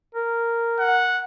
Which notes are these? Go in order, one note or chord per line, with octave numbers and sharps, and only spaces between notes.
A#4
F#5